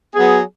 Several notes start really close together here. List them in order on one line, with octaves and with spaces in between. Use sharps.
G#4 B3 F#3